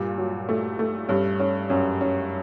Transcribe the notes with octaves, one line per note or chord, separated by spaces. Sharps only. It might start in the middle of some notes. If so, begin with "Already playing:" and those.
Already playing: G2 A#2
F#3
A3
A3
G2 C#4
C#4
F#2 C#4
C#4